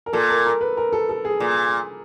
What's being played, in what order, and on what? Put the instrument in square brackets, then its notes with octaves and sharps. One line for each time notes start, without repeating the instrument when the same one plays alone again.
[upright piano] A#4
[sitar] A#2 [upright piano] A4
[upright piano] A#4
A#4
B4
A#4
A4
A4
G#4
[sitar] A#2